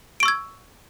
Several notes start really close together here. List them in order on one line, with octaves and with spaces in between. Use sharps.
D7 C#6 E6 G#6